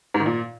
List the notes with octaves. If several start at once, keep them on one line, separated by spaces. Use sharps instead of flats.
G#2
D#3
A#2